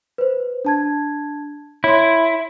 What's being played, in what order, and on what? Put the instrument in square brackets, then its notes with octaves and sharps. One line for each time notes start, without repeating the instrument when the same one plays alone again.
[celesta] B4 C5
D4 A5 G#6
[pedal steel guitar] E4 [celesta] C#5 C6